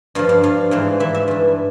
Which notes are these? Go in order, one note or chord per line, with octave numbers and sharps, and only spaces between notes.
G2 F3 F5
F5
G2 F3 F5
G#2 E3 F5
G#2 E3 E5
E5
G2 E3